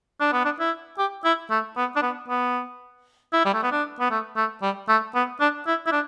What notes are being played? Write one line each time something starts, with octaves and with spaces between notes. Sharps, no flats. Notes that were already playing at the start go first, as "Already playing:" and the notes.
D4
B3
D4
E4
G4
E4
A3
B3
D4
B3
B3
E4
G3
A3
B3
D4
B3
A3
A3
G3
A3
B3
D4
E4
E4
D4